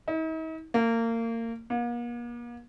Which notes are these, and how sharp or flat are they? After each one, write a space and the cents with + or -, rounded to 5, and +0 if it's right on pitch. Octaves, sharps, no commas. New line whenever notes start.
D#4 +45
A#3 -30
A#3 +40